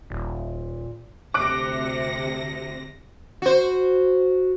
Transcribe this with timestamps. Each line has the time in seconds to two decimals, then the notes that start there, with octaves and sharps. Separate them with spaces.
0.10 D#1 A#2
1.34 D2 C3 D6 F#6 A#6 D7
3.42 F#4 C5